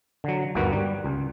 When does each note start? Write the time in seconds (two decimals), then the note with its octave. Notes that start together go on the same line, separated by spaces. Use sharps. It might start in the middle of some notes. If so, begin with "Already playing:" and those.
0.24 D3 F#3
0.55 G1 D#2 G#2 A#3 F#4 B4
0.73 G3
1.04 C#2